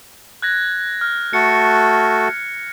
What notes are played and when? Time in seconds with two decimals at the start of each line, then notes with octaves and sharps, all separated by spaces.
0.42 F#6 G#6 A#6
1.01 F6
1.33 A3 F#4 A4 C#7